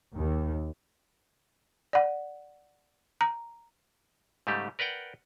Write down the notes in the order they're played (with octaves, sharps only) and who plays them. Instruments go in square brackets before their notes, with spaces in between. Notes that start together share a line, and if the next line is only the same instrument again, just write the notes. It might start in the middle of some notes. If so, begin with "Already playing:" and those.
[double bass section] D#2
[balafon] D5 F#5
A#5
[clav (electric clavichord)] G#2 C#3 G3 A3 G4
A#4 B4 D5 F#5 G5